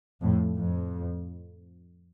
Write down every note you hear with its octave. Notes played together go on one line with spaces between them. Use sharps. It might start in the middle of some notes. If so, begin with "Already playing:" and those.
F2 A2
F2